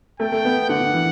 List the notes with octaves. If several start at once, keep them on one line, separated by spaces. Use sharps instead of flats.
A3 G5
A3
B3
D3 F#5
D3
E3